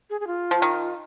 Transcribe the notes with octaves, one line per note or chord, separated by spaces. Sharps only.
G#4
G#4
F4
F3
D#3